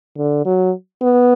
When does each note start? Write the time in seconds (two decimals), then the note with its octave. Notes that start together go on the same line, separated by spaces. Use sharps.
0.18 D3
0.46 F#3
1.02 B3